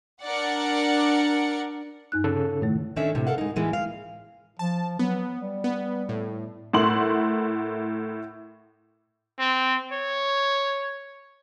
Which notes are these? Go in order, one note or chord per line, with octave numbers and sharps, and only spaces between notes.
D4 A#4 D5 F#5 C#7
G2 D#4 F#6
C#3 A4
A2 D#3 A3
D#3 C#4 D4 A4 C#5 E5
A2 C3
A4 A#4 F5 F#5
G#3 D#4
A2 E3 G#3 A#3 B3
F5
F3 A5
F#3 B3
G3
B3
A2
A2 E4 A#4 F#5 C6 F#7
C4
C#5